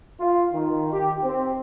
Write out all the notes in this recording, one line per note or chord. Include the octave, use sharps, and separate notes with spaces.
F4
D#3
G4
C4